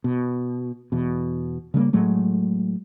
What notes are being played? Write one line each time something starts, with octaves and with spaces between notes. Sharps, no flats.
B2
E2 B2
C#3 G3 A3 A#3
A2 F#3 G#3 A3